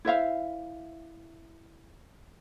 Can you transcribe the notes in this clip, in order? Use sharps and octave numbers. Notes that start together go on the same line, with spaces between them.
E4 C5 E5 F5